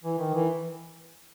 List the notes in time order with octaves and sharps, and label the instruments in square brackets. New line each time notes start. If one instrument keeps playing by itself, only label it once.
[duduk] E3
D#3
E3